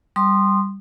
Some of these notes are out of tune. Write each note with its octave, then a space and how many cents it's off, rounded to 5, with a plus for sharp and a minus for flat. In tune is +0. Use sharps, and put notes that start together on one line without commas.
G3 +0 C6 +0 D#6 -25